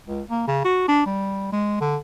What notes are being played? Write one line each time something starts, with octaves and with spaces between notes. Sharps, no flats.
C#2
A#3
C#3
F#4
D4
G3
G#3
D3